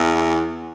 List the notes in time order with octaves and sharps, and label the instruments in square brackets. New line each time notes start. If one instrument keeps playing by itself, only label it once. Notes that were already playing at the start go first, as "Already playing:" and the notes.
Already playing: [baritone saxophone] E2